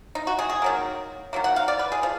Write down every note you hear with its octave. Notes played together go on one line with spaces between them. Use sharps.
D#4
F#4
G#4
G#4
D#3 F#3 A#3
D#3 F#3 A#3
F#5
F5
D5
B4
G#4
F3